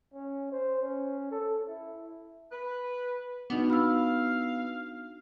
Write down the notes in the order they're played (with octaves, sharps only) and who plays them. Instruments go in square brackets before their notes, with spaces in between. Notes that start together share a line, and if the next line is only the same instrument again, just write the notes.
[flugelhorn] C#4
C5
C#4
A4
E4
[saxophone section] B4
[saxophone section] B2 [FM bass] B3 [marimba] D4 D#4 F#4
[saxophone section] F5 [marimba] B5 E6